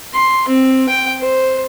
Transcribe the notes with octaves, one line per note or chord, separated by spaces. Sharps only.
C6
C4
G5
C5